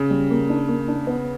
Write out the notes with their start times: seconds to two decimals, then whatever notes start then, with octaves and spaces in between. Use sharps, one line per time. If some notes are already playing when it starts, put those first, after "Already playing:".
Already playing: C#3
0.10 G3
0.30 A#3
0.50 D4
0.68 A#3
0.88 D4
1.07 B3